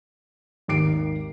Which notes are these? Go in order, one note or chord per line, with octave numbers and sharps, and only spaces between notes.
G#1 D#2 D#3 D6 C7 D7